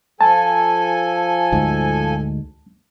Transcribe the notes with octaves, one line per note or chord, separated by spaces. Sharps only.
F3 A4 G#5 A5
D2 G#2